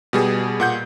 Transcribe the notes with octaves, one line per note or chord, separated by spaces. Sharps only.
B2 G3 G#4
A#2 F#5 G6